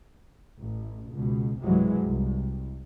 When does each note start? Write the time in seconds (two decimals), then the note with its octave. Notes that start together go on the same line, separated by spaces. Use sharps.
0.60 A1
1.14 C#2 B2
1.62 B1 G2 C3 E3 F#3 G#3
2.04 C2